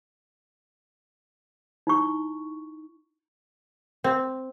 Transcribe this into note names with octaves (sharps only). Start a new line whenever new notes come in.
D#4 E4 C#6
C4